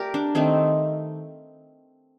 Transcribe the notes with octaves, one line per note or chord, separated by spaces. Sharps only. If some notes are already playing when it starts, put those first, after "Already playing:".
Already playing: A3 G4 A#4 D5
D4
D#3 A3 C4 D#4